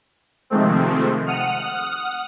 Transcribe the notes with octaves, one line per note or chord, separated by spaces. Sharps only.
C3 D#3 F3 G#3 A3 C4
F#5 D#6 F6